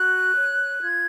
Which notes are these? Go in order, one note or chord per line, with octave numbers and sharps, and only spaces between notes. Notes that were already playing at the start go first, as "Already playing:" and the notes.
Already playing: F#4 F#6
C#5
F4 G#6